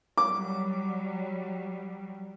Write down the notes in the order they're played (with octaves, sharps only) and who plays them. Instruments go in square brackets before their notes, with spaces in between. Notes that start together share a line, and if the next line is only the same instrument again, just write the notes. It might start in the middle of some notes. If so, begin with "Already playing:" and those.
[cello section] F#3 G3 [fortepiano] D6